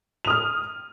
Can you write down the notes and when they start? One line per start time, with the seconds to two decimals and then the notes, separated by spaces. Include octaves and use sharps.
0.25 F7
0.27 D#6
0.30 F6